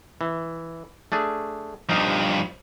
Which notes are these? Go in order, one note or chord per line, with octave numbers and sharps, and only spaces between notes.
E3
A3 D4 G#4
G2 F3 D#4 F5